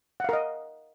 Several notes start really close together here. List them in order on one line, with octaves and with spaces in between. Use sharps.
F#5 F5 A#4 D#5